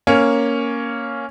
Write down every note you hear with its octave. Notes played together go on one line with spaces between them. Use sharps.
A#3 C#4